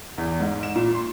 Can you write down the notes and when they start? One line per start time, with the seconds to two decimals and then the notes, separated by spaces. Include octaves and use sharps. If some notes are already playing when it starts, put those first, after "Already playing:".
0.18 E2
0.40 G#2
0.63 E7
0.76 A#2
0.95 C6